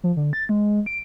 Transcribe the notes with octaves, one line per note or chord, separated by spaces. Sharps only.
F3
D3
A6
G#3
D7